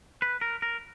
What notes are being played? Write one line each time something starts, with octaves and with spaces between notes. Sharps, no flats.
B4
A#4
A#4